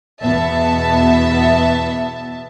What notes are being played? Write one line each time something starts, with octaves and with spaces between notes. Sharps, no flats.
E2 B2 B3 E5 A5